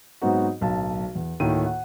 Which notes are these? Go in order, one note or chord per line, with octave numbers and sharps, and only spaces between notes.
G#2 F#3 B3 C4 D#4 F#4
D1 B1 F5 A5
E2
D2 A2 D#3 A#3 G5 D#7
F#5